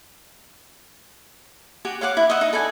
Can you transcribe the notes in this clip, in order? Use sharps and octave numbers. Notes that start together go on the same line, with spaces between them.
F#4 G4 F#5 G#5
C#5 F5 F#5 D6
E4
D#5 E5 F#5
D#4
A4 B4 D5 G#5